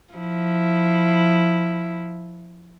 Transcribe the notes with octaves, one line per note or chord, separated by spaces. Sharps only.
F3 E4